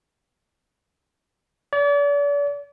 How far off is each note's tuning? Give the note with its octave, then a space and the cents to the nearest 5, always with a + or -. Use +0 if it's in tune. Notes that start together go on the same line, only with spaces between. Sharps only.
D5 -40